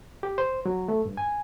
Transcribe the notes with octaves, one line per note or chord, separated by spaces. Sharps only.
G4
C5
F#3
A3
G2
G#5